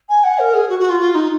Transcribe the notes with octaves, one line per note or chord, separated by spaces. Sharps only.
G#5
F#5
A#4
G#4
F#4
F#4
F4
F4
D#4